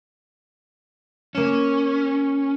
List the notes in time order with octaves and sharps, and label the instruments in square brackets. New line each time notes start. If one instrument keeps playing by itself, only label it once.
[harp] A#3 E7 [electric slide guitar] C#4